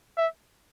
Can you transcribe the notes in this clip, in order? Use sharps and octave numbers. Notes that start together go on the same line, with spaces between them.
E5